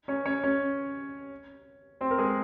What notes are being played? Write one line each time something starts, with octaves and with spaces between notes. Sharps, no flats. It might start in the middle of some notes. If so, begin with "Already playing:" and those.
C#4 C#5
C#4 C#5
C#4 C#5
C4 C5
A#4
G#3 G#4